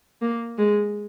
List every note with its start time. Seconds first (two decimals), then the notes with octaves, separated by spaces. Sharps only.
0.22 A#3
0.58 G#3